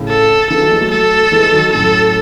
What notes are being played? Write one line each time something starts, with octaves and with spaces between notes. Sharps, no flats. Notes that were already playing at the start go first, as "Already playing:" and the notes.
Already playing: A2 C#3
A4
C#3 E3 A4
D#3 F#3
E3 G#3
F#3 A3
F#3 A3 A4
E3 G#3
D#3 F#3
F#2 A2 A4